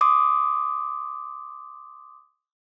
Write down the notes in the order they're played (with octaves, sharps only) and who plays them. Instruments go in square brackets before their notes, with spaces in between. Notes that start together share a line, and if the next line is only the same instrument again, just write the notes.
[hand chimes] C6 D6 D#6